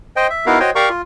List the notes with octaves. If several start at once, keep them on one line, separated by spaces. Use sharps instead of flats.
C5 D#5 G5
E5
B3 D#4 E4 F#4 A#4 F5
F#4 C5 C#5 D#5 G5
G4 A#4 D5 F5 A#5 C#6
F4